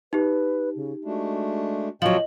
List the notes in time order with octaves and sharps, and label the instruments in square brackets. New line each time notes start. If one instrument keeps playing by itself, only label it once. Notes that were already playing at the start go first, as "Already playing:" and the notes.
[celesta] D#4 G4 [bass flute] B4
[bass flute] C#3
[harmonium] G#3 A3 D4 [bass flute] F#4
[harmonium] A2 C#3 G5 [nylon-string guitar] F3 F#3 [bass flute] D#5 [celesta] F#7